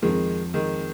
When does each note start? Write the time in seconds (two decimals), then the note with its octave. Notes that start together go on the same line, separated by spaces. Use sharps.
0.02 F2 D#3 F3 G#3 C4 F4
0.54 D#3 G#3